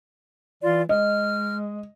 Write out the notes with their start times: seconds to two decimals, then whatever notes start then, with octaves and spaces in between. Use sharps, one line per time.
0.63 E3 F4 D5 C6
0.89 G#3 D#5 F6